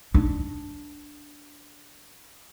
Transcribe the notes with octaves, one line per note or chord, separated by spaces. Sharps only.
D4 D#4